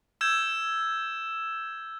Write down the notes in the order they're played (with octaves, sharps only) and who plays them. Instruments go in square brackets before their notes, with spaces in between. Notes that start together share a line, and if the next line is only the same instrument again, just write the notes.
[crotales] E6 G6 G#6 E7